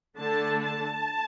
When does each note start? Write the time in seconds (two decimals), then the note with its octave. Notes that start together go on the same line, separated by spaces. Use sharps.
0.17 D3 A3 D4 A5
0.63 A5